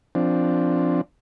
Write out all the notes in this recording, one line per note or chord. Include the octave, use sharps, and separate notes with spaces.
F3 C4 D4